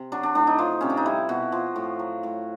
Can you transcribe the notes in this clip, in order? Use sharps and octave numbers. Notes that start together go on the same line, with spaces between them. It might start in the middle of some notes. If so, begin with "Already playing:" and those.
Already playing: C3
F#3 D4
D4
A2 D4
D#4
F3
C3 C#4
D4
D#4
G3 E4
B2 F#4
F3
A2
F#3
A2